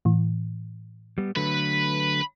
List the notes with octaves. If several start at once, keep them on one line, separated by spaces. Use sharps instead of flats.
A2 E3
G3 B3
D3 F#3 A3 B4